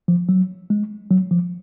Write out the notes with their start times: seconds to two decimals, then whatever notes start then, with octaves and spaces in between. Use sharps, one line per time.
0.08 F3
0.29 F#3
0.70 G#3
1.10 F#3
1.31 F3